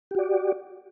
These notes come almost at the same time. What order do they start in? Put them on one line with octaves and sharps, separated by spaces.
G4 F#4 D5